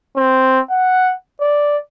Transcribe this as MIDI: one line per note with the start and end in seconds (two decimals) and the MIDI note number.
0.16 0.60 60
0.70 1.13 78
1.41 1.77 74